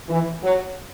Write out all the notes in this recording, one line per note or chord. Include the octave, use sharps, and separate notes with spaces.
E3
F#3